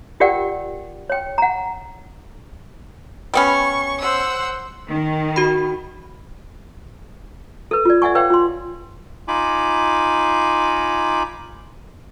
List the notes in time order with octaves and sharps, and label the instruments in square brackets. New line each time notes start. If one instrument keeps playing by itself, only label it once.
[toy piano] F4 G4 A#4 D5 F#5 G5
C#5 G5
F#5 A#5
[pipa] G3 B3 C#4 [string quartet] C#6
[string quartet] C5 F#5 E6
[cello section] D#3
[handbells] F#4 B5
[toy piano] A4 B4
F4 D5
D5 E5 F#5 G#5 C#6
B4 C#5 F5 G5
F4 C6
[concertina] D#4 F4 G#5 B5 D6